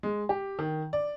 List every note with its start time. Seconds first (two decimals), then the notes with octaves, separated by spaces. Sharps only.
0.03 G#3
0.29 G4
0.59 D#3
0.93 D5